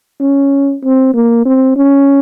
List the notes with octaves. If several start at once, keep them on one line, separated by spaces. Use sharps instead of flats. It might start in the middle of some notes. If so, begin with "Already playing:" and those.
C#4
C4
A#3
C4
C#4